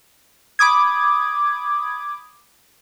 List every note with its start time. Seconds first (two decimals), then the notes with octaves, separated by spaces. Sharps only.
0.59 B5 D6 D#6 G#6